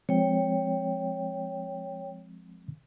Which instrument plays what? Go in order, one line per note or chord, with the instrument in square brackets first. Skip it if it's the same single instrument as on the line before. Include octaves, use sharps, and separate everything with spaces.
[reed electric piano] F3 G#3 C4 [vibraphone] C#5 G5